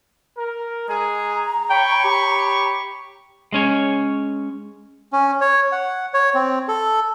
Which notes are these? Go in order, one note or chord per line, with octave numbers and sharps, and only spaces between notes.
A#4
G#3 G#4 A#5
C#5 G5 B5 C#6
G4
G#3 C#4 C#5
C#4
C#5
F#5
C#5
C4
A4